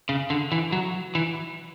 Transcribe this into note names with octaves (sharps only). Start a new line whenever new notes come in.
C#3
D3
E3
F#3
E3